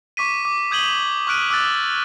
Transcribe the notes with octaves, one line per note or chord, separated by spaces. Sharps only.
C#6 D6 B6 D#7
D6
D#6 G6 G#6 D#7 F#7 G7
C#6 F6 F#6 D7 D#7
D6 E6 F#6 A6